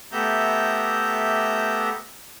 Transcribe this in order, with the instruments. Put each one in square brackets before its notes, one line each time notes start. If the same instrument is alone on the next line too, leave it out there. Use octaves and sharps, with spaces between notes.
[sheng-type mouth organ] A3 B3 G4 E5 A#5 G6